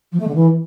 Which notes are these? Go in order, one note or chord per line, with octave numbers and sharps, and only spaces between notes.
F3
A3
D3
E3